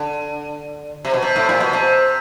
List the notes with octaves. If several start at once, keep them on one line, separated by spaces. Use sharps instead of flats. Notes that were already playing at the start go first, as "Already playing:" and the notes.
Already playing: D3
C3
B2
C3
A2
A#2
B2
C3